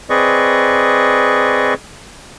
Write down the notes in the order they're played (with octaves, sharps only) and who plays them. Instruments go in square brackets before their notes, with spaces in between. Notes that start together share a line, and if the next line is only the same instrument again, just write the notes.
[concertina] C4 G#4 B4 D5 D#5 C#6